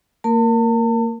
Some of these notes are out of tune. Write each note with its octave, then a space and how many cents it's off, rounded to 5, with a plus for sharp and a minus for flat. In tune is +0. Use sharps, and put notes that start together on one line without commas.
A#3 -25 A#4 +0 A5 +40